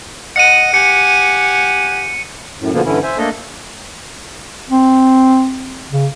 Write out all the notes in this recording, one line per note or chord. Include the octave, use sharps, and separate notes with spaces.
D#5 F#5 C#7 D#7
G4 F#5 G#5 C#7
F#2 A2
B2 D3 F3 A#3 B3
G2 D3 E3 C#4 E4
C5 E5 G#5
A3 A#3 D4 A4 D#5
C4
C#3